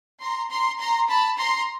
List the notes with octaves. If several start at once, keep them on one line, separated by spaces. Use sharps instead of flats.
A#5 C6
A#5 C6
A#5 C6
A5 B5
A#5 C6